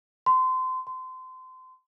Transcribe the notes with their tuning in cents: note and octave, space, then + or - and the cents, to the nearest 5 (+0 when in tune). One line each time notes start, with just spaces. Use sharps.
C6 -30
C6 -30